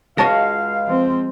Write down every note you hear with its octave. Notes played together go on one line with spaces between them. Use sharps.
C#2 G#3 F#4 C#5 F5 A5 A#6
F3 C4